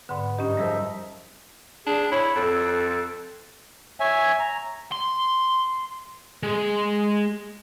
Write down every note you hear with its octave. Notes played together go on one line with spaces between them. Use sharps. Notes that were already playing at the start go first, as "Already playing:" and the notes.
G#2 D3 B3
G2 C#4 D#4 G4
F#2 F3 G3 G#4 A#4 E5
D4 G#4
E4 C#5
F2 A4
C#5 E5 G#5
A#5
C6
G#3